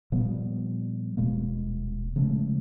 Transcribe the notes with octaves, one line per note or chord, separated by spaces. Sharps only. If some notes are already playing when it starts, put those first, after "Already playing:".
A#2 F3 G3 B3
D#1 B2 G#3 A#3
C#3 F3 G#3 A3